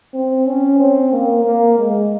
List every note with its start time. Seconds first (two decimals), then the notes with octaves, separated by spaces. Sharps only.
0.14 C4
0.46 C#4
0.80 C4
1.13 A#3
1.45 A#3
1.79 G#3